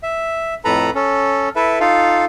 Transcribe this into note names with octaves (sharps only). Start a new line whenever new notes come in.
E5
F2 A2 A4 B4 A#5 B5
C#4 A4
E4 A4 B4 E5
D#4 F4 A4 F5